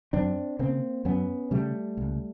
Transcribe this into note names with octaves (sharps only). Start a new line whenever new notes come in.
F#2 C4 D4
C#3 A#3 C4
F#2 B3 C#4
C#3 G3 A3
C#2